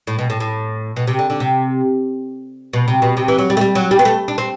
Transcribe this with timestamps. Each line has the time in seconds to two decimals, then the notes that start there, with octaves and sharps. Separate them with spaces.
0.07 A2
0.19 B2
0.30 A2
0.40 A2
0.96 B2
1.07 C3
1.19 D3
1.30 D3
1.40 C3
2.73 B2
2.88 C3
3.02 B2
3.17 C3
3.28 E3
3.38 F#3
3.50 G3
3.57 A3
3.61 G3
3.75 F#3
3.91 G3
3.99 B3
4.05 A3
4.28 D4
4.38 C4